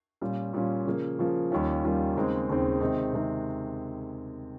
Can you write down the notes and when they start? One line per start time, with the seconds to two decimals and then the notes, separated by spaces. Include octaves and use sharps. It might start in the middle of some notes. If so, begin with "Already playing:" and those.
0.22 A#2 G3 C#4 F4
0.53 A#2 G3 C#4 F4
0.86 C#3 F3 A#3
1.19 C#3 F3 A#3
1.51 D#2 D#3 G3 C#4 F4
1.84 D#2 D#3 G3 C#4 F4
2.15 D#2 C#3 G#3 C4 D#4
2.49 D#2 C#3 G#3 C4 D#4
2.80 C3 D#3 G#3 C4 D#4
3.13 C3 D#3 G#3 C4 D#4